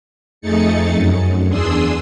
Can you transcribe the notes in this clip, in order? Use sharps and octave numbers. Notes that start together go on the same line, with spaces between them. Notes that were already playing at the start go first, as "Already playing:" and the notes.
F2 A3 D#4 G#4 A6 C#7
F#2
E2 D4 G#4 C6 D#6 E6